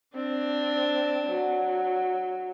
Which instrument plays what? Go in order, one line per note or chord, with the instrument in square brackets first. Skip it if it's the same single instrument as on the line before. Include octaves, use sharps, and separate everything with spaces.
[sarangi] C4 [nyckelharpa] D4
[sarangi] F#3